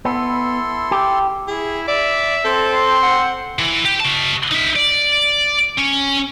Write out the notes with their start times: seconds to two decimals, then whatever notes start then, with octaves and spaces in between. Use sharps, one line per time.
0.05 B3 E4 A4 C6
0.91 G4
1.48 E4 G#4
1.88 D5 E5
2.45 C4 A4
2.74 C6
3.03 F#5
3.59 E3
3.85 G4
4.00 F#4 A5
4.52 D#4 E5
4.76 D5
5.78 C#4